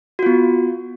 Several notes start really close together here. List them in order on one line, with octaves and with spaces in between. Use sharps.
F#4 F4 B3